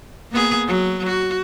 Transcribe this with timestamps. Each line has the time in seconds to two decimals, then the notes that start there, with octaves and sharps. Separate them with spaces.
0.31 A#3 B3 G#4
0.67 F#3
1.06 F#4